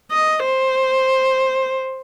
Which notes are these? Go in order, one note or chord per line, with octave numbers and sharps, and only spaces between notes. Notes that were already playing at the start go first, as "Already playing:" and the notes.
D#5
C5